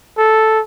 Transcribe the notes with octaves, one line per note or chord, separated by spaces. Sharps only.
A4